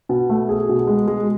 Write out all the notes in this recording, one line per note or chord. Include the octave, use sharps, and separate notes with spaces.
B2
A3
G#4
B2
G#3
G#3